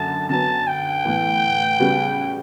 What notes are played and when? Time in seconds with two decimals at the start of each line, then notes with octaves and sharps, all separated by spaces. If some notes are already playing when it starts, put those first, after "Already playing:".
Already playing: F#2 D3 A5
0.29 D3 F#3 B3 A5
0.67 G5
1.05 A2 E3 B3
1.80 C#3 G3 B3 F#4